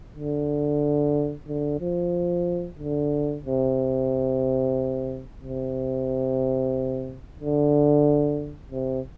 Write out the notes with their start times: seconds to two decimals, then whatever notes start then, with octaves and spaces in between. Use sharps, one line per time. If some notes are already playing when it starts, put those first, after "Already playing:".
0.16 D3
1.48 D3
1.80 F3
2.79 D3
3.45 C3
5.42 C3
7.40 D3
8.71 C3